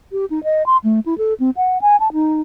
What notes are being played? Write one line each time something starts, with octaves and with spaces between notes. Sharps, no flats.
G4
D#4
D#5
C6
A3
E4
A4
C4
F#5
G#5
A5
D#4